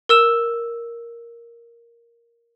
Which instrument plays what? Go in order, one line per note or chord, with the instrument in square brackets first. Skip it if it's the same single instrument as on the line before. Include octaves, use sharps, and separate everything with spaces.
[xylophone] A#4 E6 E7